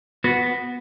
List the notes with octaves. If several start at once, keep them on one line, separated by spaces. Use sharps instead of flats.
B3 F#4